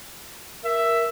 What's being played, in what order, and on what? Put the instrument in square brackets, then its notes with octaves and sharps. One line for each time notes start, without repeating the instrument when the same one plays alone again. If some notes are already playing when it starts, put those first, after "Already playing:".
[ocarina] A#4 [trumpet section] E5